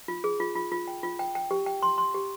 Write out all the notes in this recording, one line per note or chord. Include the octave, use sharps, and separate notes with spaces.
F4
G#4
F4
F4
F4
G5
F4
G5
G5
G4
G5
C6
C6
G4